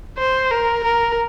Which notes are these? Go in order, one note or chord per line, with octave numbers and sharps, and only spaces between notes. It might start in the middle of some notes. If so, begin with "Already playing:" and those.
C5
A#4
A#4